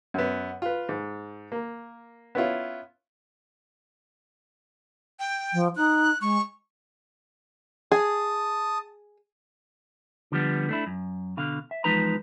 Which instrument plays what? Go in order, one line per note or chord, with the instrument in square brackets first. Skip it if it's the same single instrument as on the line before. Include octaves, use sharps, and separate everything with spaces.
[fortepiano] F#2 B3
F4 B4
G#2
A#3
B3 C#4 E4 F4
[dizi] G5
[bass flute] F3
[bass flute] D#4 [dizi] F#6
[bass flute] G#3 [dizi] C#6
[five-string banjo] G#4 [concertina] A5 D#6
[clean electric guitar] D3 F3 G3 B3
A3 D4 E4
F#2
B2 D3 F5
E5
E2 F3 G#3 D#4 B4 A#5